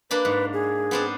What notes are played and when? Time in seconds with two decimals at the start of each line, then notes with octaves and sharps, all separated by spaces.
0.11 A#3 D4 B4 B5
0.25 G#2
0.53 G#4
0.91 B3 C4 D4